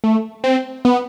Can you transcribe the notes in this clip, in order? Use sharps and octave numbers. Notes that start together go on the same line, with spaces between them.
A3
C4
B3